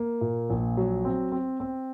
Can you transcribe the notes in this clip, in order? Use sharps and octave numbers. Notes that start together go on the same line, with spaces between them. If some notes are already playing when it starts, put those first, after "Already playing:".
Already playing: A#3
A#2
A#1
F#3
C4
C4
C4